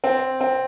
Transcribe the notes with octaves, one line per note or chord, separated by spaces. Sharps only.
C4
C4